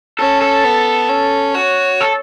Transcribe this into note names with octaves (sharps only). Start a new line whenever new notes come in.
C#4 A4
A4
B3
C#4
F#4 C#5
A4